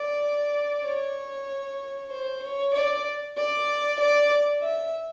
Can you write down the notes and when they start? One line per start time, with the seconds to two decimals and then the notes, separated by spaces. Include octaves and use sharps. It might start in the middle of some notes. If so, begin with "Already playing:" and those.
Already playing: D5
0.84 C#5
2.11 C5
2.42 C#5
2.73 D5
3.37 D5
3.99 D5
4.62 E5